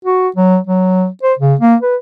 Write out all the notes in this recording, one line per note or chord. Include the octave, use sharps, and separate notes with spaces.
F#4
F#3
F#3
C5
C#3
A#3
B4